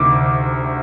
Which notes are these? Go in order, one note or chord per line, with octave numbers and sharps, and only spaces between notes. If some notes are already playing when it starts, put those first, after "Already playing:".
Already playing: D2 C3 D#3 D6